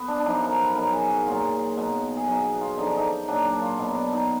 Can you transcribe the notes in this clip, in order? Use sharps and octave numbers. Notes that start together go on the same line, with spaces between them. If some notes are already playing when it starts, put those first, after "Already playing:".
Already playing: B3
D4
D4
F#2 F3 D#4
A#4
B4
B2 F#3 A#4
G#4
F#4
A#2 F#3 F4
B2 F#3
G#4
B2 F#3 F#4
F#4
F4
F#2 D3 F3 D#4
D4
D#4
A#2 F#3 D4
D4
F4
B2 F#3 B3
D4
D#4